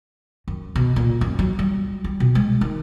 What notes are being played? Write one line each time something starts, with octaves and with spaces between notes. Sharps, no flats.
F#2
B2
A#2
F#2
F#3
G3
G3
B2
G#3
D#3